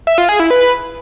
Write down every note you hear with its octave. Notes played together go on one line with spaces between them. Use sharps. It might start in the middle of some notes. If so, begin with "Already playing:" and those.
E5
F4
G#4
E4
B4